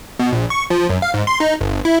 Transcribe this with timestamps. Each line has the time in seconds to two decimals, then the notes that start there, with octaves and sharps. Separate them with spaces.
0.19 B2
0.32 A#1
0.50 C#6
0.70 F3
0.89 F#2
1.02 F5
1.14 G#2
1.27 C6
1.40 D#4
1.61 G1
1.85 E4